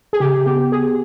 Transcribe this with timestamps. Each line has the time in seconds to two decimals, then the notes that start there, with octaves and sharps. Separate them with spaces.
0.13 G#4
0.20 C#3 G4
0.46 B3 G4
0.72 G4 G#4